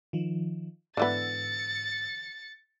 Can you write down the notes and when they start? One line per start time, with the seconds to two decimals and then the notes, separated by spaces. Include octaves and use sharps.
0.13 D#3 F3
0.97 G#2 D3 E3 B3 E6 A6 C#7